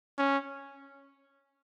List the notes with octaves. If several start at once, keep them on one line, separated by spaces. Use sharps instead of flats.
C#4